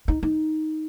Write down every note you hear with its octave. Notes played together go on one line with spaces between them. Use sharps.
D#4
D#4